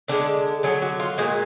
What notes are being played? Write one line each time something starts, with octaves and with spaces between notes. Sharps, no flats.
D3 G#3 D4
D3 F#3 G#4
F#4
F4
A#2 G#3 F#4